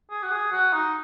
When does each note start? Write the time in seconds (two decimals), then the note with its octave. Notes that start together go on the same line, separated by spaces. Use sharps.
0.10 G#4
0.23 F#4
0.31 G#4
0.52 F#4
0.73 D#4